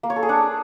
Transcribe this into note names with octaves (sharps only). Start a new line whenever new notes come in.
A#3
C#5
A4
G#4
D4